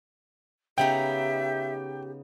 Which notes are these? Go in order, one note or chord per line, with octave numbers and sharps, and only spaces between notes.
C#3 B3 D#4 G4 E5 G5